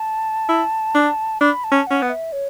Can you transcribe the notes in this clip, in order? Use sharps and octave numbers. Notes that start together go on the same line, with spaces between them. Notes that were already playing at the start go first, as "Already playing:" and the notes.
Already playing: A5
E4
D4
D4 B5
A5
C#4
C#4 F#5
B3
E5
C#5